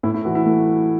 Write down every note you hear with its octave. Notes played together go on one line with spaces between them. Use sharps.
A2 E4
E4
E3 F#4
E4
A3